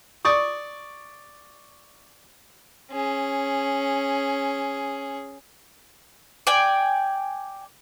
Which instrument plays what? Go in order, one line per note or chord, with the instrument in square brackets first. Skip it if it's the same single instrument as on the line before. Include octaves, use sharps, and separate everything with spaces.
[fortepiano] D5 C#6 D#6
[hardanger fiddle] C#4 G#4
[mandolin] D5 G5 G#5